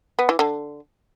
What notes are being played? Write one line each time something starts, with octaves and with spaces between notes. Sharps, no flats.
B3
E3
D3